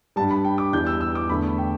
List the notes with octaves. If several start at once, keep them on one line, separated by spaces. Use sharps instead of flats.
G2 G3 A5
B5
G5
D6
E2 E3 G3 G6
E6
E6
D6
E2 D3 A3 B5
G5